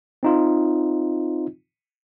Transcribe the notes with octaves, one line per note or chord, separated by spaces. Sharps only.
C4 D#4 F4